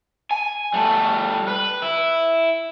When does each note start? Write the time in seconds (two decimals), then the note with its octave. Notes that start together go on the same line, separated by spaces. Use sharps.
0.31 G#5
0.74 G3 A3
1.48 B4
1.82 E4